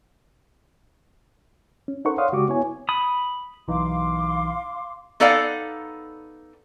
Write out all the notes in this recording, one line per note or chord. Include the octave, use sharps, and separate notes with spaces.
C#4
D#4 A4 A#4 C5 F#5 C#6
C#5 D5 F5 F#5 C6 D#6
C#3 G#3 F#4 G4 C#6 D6
B3 E4 C#5 G#5
B5 D#6
B1 E3 D#4 F5 C6 D6
B3 D#4 A4 D5 F5 F#5